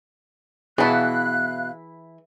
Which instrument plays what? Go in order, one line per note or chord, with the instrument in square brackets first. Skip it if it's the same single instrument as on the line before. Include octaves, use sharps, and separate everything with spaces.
[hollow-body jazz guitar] B2 [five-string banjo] E3 E4 [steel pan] G#4 F#5 A5 [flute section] F5 F#6